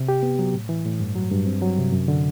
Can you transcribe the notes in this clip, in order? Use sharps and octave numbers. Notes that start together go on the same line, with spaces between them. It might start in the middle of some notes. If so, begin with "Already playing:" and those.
Already playing: C3
G4
B3
F#3
A2
E3
A2
G2
F#3
G2
C4
F#3
C3
F#2
D3